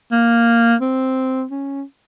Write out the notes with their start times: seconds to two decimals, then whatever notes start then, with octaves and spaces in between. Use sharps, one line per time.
0.12 A#3
0.81 C4
1.51 C#4